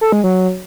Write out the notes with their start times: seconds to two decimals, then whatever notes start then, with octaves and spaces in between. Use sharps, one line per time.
0.01 A4
0.12 G#3
0.24 F#3